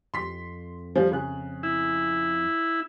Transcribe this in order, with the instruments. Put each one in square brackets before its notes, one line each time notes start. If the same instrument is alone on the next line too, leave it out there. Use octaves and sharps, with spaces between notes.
[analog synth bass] F2 [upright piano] C6 B6
[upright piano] F3 G3
C#3 F#6
[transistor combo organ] E4